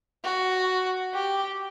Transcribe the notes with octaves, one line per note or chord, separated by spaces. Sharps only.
F#4
G4